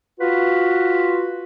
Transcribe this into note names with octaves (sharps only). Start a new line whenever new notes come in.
F4 F#4 B4